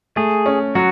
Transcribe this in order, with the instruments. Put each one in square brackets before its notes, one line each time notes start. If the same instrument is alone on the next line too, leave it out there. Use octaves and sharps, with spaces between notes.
[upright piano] A3 [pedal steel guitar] G#4
[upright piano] C#4
[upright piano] F#3 [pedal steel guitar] F#4